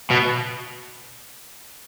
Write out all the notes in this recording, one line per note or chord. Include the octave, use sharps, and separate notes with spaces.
B2